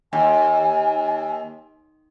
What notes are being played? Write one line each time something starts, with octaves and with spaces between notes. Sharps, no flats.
D#2 G#5